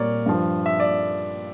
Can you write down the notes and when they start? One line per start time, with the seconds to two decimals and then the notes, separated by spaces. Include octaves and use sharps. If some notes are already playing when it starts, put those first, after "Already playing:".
Already playing: A#2 G3 A#4 C#5 D5
0.26 G2 F3
0.66 E5
0.80 D5